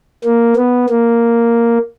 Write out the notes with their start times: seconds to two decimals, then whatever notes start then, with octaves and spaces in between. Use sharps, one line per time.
0.24 A#3
0.56 B3
0.89 A#3